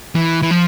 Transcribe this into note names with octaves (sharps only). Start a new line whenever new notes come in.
E3
E3
F3